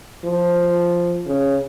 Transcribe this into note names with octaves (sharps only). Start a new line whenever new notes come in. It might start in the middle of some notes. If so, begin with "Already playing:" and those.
F3
C#3